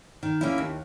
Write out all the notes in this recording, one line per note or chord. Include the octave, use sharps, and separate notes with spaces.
D#3
A#3 C#4 E4
D#2